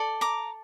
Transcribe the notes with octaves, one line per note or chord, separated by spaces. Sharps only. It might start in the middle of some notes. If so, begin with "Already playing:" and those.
Already playing: A4 D5
A#5 D6